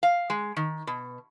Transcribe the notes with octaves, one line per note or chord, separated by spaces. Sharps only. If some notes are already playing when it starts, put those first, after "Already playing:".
F5
G#3
D#3
B2